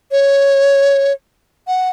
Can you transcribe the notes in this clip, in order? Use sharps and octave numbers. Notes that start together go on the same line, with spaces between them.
C#5
F#5